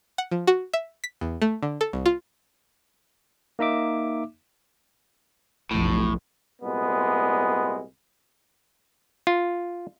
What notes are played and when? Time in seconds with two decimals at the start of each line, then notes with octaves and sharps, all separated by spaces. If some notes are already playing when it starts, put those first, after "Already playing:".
0.18 F#5
0.31 F3
0.47 F#4
0.73 E5
1.04 B6
1.21 E2
1.42 A3
1.63 D3
1.81 A4
1.93 C2
2.06 F4
3.59 A#3 D#4 E5 D6
5.71 F1 B1 A2
6.62 C2 A#2 G#3 B3
9.27 F4